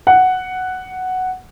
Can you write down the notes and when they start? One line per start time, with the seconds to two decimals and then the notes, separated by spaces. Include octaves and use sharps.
0.07 F#5